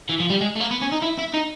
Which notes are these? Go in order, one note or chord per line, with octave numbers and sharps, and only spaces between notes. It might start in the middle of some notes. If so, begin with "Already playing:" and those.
E3
F3
G3
G#3
A3
A#3
B3
C#4
D#4
E4
E4
D#4